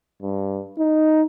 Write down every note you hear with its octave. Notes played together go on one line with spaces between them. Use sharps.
G2
D#4